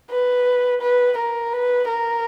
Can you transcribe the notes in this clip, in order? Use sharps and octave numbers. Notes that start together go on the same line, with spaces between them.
B4
B4
A#4
B4
A#4